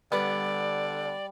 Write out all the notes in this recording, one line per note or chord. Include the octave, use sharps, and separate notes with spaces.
D3 G3 B3 D5